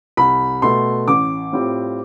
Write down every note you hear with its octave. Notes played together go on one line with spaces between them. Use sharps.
C2 B5
B2 A3 C6
A1 D6
A2 G3 C4 F4